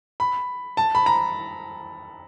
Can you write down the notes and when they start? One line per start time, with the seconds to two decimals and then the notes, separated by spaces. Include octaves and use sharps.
0.20 B5
0.77 A5
0.95 B5
1.06 A#5